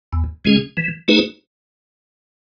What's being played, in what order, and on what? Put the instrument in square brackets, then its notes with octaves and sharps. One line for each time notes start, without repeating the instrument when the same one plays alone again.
[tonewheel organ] E2
C#3 G#3 C#4 G#4
E3
A3 D#4 G#4 B4